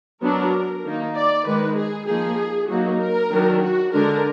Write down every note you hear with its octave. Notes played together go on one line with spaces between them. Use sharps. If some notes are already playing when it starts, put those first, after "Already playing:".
F#3 B3 D4 A#4
D#3 A#3 D#4
D5
D#3 G#3 D#4 B4
G#4
F3 A#3 D#4 G#4
F#3 A#3 D#4 F#4
A#4
D#3 F#3 D4
F#4
D3 G#3 D4 A#4